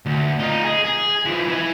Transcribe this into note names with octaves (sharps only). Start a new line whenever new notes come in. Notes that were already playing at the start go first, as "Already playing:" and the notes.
D2
D#4 F4
G#4
G#4
E3 F3
E4 G#5